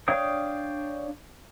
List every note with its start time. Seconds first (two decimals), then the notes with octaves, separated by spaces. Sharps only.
0.08 D4 C#5 F5 G5 D#6